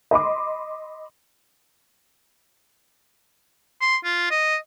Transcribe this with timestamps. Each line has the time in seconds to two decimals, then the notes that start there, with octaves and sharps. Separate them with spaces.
0.11 D#5 B5 C6 D6
3.81 C6
4.04 F4
4.31 D#5